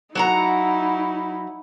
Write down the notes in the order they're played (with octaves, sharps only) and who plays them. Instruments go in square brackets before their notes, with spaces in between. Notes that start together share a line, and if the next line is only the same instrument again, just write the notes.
[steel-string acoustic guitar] F#3 F#5 A#5 [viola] D#4 E4